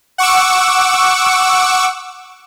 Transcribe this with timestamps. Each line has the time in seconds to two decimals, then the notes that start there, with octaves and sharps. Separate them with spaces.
0.18 F#5 C#6 D6 E6